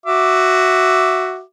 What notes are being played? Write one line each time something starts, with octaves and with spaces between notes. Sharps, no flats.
F#4 E5 D6